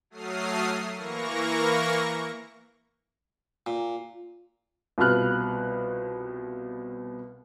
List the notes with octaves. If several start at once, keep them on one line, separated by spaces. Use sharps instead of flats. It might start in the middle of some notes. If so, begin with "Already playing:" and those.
F#3 A3 D#6 F6 C7
E3 A#3 A#4 C#6 A#6
A#2
C2 B2 F4 B4 F6 F#6